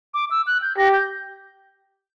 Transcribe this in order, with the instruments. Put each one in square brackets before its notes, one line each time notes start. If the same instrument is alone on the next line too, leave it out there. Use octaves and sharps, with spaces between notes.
[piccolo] D6
E6
F#6
G6
[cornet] G4 [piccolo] A#6
[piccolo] G6